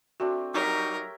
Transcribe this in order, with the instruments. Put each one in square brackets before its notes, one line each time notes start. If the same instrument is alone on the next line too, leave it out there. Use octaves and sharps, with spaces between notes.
[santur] A3 C4 D4 [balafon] F#4
[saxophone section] F#3 G3 D#4 [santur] G4 C#5 E5 [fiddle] A#4